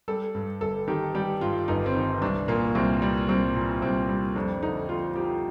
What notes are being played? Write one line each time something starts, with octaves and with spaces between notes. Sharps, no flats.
G3 A4
G2
G1 A4
D#3 G4
G3 G4
G2 F4
G1 D#4
C4
D#3
C2 D4
A#2 A#3
C2 C4
G3
C2 C4
A#2
C2 C4
G3
F2 D4
D3 D#4
F2 F4
F3 G4